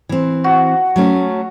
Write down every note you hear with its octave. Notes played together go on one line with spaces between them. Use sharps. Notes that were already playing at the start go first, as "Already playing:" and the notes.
E3 C4
F#4
F#3 A3 C#4